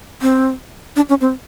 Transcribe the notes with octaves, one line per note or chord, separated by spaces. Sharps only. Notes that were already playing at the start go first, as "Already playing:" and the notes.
C4
D4
C#4
C4